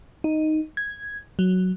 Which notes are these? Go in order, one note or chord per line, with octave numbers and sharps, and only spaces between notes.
D#4
G#6
F#3